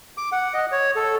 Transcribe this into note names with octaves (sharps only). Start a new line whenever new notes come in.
D6
F#5
D#5
C#5
A4